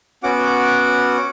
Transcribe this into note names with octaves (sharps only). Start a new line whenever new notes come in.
B3 C#4 F#4 F#5 D6